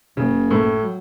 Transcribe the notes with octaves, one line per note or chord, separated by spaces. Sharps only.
F#1 C#3
A2
F#3